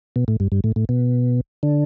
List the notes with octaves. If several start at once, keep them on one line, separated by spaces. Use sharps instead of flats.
B2
A2
G2
G2
A2
A2
B2
D3